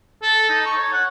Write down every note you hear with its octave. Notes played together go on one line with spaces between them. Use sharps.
A4
D#4
C#6
C#5
F#5